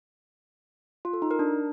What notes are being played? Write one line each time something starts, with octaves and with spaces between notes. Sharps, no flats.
F4
A4
D#4
A#4
D4